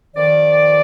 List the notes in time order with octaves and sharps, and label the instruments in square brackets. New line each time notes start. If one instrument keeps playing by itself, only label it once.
[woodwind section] F2 D#3 D5